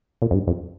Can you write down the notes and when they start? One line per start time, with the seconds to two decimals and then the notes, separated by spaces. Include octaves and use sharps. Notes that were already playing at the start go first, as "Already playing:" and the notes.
0.22 A#2
0.31 F2
0.34 G2
0.47 F2